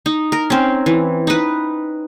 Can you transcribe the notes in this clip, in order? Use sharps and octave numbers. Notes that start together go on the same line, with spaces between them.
D#4
A#4
C4 C#4
E3
D#4 B4